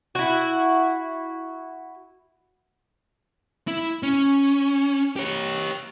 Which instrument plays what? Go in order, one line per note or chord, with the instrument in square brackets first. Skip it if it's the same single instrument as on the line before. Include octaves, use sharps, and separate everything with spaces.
[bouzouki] E4 F#4
[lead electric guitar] E4
C#4
G4 C#5